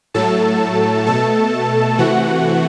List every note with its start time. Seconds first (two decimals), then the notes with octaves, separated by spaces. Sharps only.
0.14 A2 F#3 A3 A4 A5
1.07 B2 A3 A4 A5
1.99 C3 E3 A3 F#4 F#5